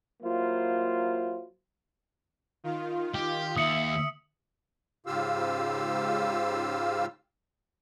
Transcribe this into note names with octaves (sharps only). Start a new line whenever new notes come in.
F#3 A#3 E4 F4 C5
D#3 F4
G4
D#2 E5 D#6 C#7 F#7
G#2 C#3 F4 G4 F5 E6